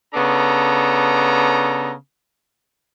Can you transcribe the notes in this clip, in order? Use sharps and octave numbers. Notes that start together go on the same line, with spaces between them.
C#3 B3 D4 A4 A#5